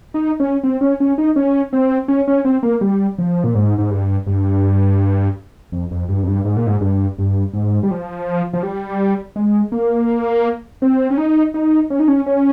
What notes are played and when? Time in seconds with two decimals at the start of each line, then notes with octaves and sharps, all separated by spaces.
0.14 D#4
0.40 C#4
0.64 C4
0.81 C#4
1.00 C#4
1.18 D#4
1.36 C#4
1.73 C4
2.08 C#4
2.28 C#4
2.45 C4
2.63 A#3
2.81 G3
3.18 F3
3.44 A#2
3.55 G#2
3.78 G#2
3.91 G2
4.27 G2
5.72 F2
5.91 F2
6.08 G2
6.23 F2
6.27 G2
6.45 G#2
6.57 A#2
6.67 G#2
6.81 G2
7.18 G2
7.54 G#2
7.83 G3
7.91 F3
8.53 F3
8.63 G3
9.36 G#3
9.72 A#3
10.82 C4
11.10 C#4
11.18 D#4
11.54 D#4
11.90 C#4
11.99 D#4
12.08 C#4
12.26 C#4